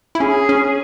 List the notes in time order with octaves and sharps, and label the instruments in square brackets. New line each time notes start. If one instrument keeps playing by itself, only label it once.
[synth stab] E4
[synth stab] C#4 [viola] G#4
[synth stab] C#4